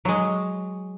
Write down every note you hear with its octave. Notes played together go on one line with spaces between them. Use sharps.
F#3 G#3